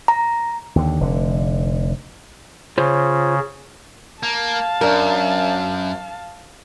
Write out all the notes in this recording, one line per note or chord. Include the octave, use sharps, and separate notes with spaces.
A#5
D#2 D3
F1 D3
C#3 F4 C5 C#5
A#3 F5 A5
F#2 D4 A#4